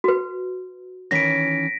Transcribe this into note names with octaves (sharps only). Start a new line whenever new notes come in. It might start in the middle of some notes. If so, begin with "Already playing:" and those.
F#4 B4
D#3 E3 C#4 A#6 B6 D7